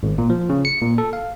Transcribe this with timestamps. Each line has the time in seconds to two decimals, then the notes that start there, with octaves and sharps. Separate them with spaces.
0.03 G#1
0.18 A#2
0.30 F3
0.49 C#3
0.65 C#7
0.82 A#2
0.98 A4
1.13 F5